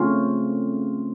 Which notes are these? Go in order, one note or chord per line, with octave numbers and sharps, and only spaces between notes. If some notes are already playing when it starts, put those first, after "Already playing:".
Already playing: C#3 A3 C4 C#4 F4